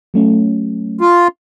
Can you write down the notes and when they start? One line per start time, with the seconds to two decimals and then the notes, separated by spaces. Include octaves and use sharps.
0.14 F#3 A3 C#4
1.01 F4